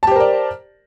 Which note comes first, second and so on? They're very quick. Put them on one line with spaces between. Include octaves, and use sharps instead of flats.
A5 G4 C5 A#4 D5